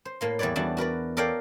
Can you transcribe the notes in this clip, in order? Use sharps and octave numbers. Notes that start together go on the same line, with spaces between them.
C5
A2 A#3 C6
E2 G3 B4 C#5 D5
E2 G3 D4 F#4 A5
F#4 A#4 B4 D5
A4 A#4 C#5 D5 F5 G5